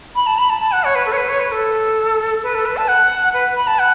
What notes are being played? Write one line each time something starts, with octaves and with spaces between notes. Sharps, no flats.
B5
A5
B5
A5
A5
F#5
C#5
B4
A4
C#5
B4
C#5
B4
A4
B4
A4
B4
A5
F#5
B4
B5
A5
F#5